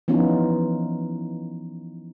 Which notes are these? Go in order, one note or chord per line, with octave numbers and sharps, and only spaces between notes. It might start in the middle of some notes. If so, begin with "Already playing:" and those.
E3 F3 B3 C#4 D#4 F4